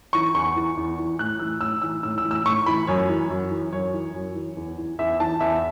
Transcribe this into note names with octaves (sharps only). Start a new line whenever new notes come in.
E3 C#6
E2 C#6
E3
E2
E3
A2 F#6
E3 E6
A2 E6
E3 E6
A2 E6
E6
E3
E6
A2 C#6
E3 B5
F#2 C#5
E3
F#2
E3
F#2 C#5
E3
F#2
E3
E2
E3
E2 E5
E3 A5
E2 E5